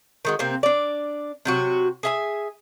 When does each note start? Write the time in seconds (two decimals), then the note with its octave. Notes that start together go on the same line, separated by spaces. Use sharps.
0.25 D#3 G#3 F#4
0.39 C3 A#3 C4
0.63 D4 D5
1.45 C3 F#3 F#4
2.03 G#4 E5 G#5